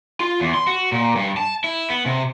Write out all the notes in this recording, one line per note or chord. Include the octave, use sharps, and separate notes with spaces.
F4
E2
C6
F#4
A#2
G2
A5
E4
B3
C3